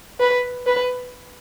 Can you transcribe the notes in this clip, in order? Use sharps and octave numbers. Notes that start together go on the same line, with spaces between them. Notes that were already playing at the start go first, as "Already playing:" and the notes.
B4
B4